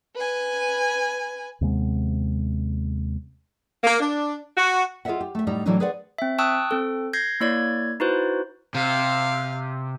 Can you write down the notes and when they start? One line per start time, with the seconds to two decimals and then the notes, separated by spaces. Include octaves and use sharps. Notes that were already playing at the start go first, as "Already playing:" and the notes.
0.14 B4 G#5
1.61 D#2 C3 G#3 B3
3.84 A#3
4.00 D4
4.57 F#4
5.05 F4 G#4 C#5 D#5 E5 F#5
5.21 G4
5.35 A3 E5
5.47 A2 G3 D#4
5.66 A2 E3 F#3 G3 D4 D#4
5.80 G#4 B4 C5 D5 F#5
6.18 C4 E5
6.38 G5 A5 C#6 D#6 E6 F#6
6.71 C4 A4
7.13 G6 G#6 A#6 C7
7.40 A#3 E4 C#5 D5 G#6
8.00 D#4 E4 F#4 B4 C5
8.75 C3 F5